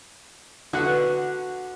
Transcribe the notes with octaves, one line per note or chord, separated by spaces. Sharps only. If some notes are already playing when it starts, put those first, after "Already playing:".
D3 F#4 B4 F#5